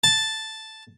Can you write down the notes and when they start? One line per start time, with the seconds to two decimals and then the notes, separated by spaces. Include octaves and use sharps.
0.04 A5